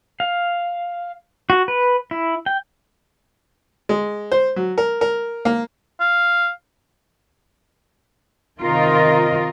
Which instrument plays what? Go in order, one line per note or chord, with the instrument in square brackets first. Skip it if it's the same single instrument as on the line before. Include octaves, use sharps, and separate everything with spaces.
[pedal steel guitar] F5
F#4
B4
E4
G5
[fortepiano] G#3
C5
F#3
A#4
A#4
A#3
[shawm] F5
[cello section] C3 D#3 F4 A#4 D#5